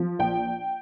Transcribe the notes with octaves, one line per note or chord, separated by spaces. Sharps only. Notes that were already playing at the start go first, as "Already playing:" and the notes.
Already playing: F3
A#1 G5